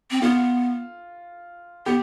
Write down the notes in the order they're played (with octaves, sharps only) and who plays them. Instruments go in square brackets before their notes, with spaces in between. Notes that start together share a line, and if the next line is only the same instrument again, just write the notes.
[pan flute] C4
[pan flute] B3 [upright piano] F4
[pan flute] B3 [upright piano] G4